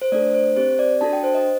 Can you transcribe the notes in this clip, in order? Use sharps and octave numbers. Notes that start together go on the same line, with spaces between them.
C5
A3 D4 A4 D5
C5
C4 G4 C5
D5
D4 F#4 A4 A5
G5
C5
D#5